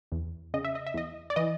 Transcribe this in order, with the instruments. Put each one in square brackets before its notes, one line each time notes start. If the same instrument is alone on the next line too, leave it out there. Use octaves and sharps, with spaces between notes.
[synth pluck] E2
C#3 D#5
E5
D#5
E5
E2 D#5
D5
E3 D#5